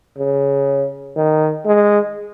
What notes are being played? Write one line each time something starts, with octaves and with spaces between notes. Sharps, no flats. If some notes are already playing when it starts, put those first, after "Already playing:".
C#3
D#3
G#3